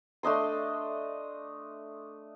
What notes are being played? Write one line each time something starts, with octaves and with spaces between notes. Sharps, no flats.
A3 D4 D#5 C6